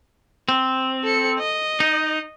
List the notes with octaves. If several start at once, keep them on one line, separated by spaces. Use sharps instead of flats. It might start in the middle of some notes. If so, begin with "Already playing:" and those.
C4
A4 C#7
D#5
D#4